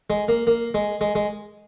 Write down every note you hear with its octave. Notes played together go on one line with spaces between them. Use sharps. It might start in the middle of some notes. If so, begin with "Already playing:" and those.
G#3
A#3
A#3
G#3
G#3
G#3